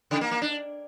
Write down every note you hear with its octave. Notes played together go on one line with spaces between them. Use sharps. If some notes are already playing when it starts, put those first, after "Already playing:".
C#3
A#3
A#3
D4